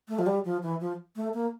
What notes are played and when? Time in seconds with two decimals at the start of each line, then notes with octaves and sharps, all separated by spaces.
0.09 A3
0.19 F3
0.27 G3
0.45 F3
0.63 E3
0.80 F3
1.16 A3
1.34 A#3